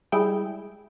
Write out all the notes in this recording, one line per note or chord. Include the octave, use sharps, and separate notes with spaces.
G3 G#3 E4 G#4 G5